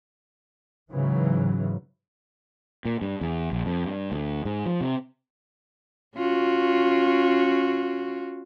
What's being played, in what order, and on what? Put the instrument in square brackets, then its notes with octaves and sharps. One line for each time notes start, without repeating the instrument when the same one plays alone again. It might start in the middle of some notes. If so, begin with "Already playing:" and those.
[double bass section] G#2 C#3 E3 F#3
[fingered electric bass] A#2
G2
E2
A#1
F2
G2
D2
G#2
F3
C3
[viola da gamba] C#4 F4 F#4